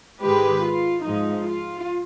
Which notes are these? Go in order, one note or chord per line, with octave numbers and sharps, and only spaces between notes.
G#2 D#3 G#3 G4 B4
F4
G#2 F3 G#3 D#4
F4